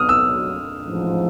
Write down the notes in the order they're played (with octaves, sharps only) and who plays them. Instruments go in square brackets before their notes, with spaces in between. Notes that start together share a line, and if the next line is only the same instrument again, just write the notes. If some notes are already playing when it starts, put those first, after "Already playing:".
Already playing: [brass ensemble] B1 B2 F#3 [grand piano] D#6 F6
[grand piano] E6
[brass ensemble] A1 G#2 F3